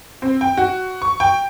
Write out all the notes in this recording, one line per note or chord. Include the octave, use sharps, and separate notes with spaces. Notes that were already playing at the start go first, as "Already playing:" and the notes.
C4
G5
F#4
C#6
G5